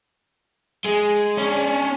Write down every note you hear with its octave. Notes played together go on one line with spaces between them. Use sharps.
G#3
C#4 D4